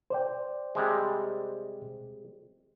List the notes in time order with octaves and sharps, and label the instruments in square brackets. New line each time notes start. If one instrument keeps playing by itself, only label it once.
[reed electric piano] C5 D5 G5
[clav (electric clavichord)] C3 G3 G#3